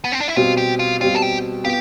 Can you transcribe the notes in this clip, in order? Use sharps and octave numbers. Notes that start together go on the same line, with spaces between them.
B3
C4
D4
E4
B2 G3 C4 F4
G4
F4
B2 G3 C4 F4
A4
G4
B3 F4 G4